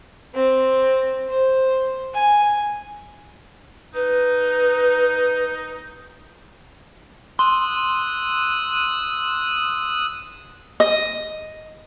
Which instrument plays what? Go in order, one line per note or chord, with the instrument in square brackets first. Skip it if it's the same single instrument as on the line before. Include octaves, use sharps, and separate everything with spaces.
[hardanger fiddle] C4
C5
G#5
[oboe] D#4 [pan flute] B4
[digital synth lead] C6 [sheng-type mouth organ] D#6 E6 F#6
[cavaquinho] D#5